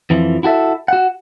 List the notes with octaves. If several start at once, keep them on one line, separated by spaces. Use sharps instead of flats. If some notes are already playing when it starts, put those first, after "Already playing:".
F2 E3 F3
E4 F#4 A4 E5
F#4 F#5